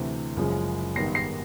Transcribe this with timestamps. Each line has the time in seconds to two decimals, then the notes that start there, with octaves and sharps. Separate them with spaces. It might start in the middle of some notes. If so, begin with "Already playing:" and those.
Already playing: D2 C3 E3 A3
0.36 F#1 F#2 C#3 F3 G#3
0.96 G#1 G#2 D#3 G3 B3 A#6 C7
1.15 A#6 C7